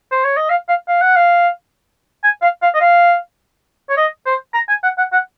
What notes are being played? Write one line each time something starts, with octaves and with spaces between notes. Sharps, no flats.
C5
C#5
D#5
F5
F5
F5
F#5
F5
G#5
F5
F5
D#5
F5
C#5
D#5
C5
A#5
G#5
F#5
F#5
F#5